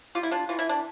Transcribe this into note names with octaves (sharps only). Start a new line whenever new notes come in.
G3 F4
E4
D4 F4
E3 F4
E4
D4